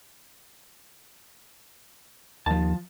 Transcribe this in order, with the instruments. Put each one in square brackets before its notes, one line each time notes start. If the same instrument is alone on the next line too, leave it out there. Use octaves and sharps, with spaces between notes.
[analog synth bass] D#2 [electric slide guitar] F3 A5